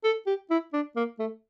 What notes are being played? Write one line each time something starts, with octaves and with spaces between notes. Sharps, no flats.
A4
G4
E4
D4
A#3
A3